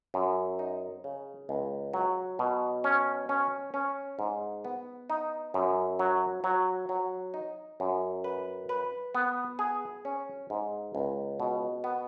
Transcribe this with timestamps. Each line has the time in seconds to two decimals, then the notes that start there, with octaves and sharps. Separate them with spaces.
0.14 F#2
0.59 D#4
1.04 C#3
1.49 C#2
1.94 F#3
2.39 B2
2.84 C#4
3.29 C#4
3.74 C#4
4.19 G#2
4.65 B3
5.10 D#4
5.54 F#2
5.99 F#3
6.44 F#3
6.89 F#3
7.34 D#4
7.80 F#2
8.24 B4
8.69 B4
9.15 B3
9.59 G#4
10.05 C#4
10.50 G#2
10.95 C#2
11.40 B2
11.84 B3